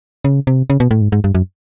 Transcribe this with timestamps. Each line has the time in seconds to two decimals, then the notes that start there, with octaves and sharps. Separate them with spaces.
0.25 C#3
0.47 C3
0.70 C#3
0.80 B2
0.91 A2
1.01 G#2
1.12 G#2
1.24 G2
1.35 F#2